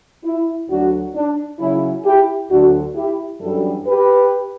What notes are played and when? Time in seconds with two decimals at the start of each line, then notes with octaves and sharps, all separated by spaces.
0.24 E4
0.69 D2 D3 F#3 D4 F#4
1.15 D4
1.59 C#3 F#3 C#4 E4
2.05 E4 G4
2.50 D2 D3 F#3 D4 F#4
2.95 E4 G4
3.41 F#2 E3 G3 D4 F#4 A4
3.87 G4 B4